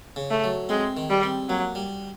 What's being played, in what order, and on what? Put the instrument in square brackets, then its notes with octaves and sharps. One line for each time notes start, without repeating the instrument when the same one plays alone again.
[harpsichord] C#3
[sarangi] A3
[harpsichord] F#3
[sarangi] G#3 [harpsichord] C4
[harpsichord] D#3
[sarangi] G3
[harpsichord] C4
[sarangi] F#3 [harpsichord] A#3
[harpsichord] G3